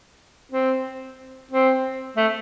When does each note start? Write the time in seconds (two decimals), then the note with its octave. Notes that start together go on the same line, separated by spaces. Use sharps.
0.52 C4
1.52 C4
2.17 A3